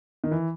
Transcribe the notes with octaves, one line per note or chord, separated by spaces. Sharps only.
D#3
E3